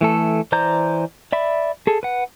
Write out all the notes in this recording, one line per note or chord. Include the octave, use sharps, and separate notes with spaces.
E3 A3 A4
E3 C5 D5 A#5 G6
D5 E5 B5
G#4 A4
B4 F#5